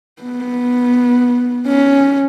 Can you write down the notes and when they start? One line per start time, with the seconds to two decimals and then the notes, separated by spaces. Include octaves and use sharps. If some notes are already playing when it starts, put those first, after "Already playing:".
0.22 B3
1.67 C#4